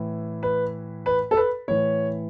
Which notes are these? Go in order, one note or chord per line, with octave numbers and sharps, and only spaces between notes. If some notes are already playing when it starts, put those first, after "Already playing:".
Already playing: A2 E3
B4
B4
A4
B4
A2 E3 C#5